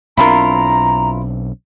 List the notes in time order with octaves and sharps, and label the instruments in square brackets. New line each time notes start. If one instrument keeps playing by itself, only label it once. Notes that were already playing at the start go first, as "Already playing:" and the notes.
[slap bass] B1 C4 D4 [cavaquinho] E4 F4 A#4 [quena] A#5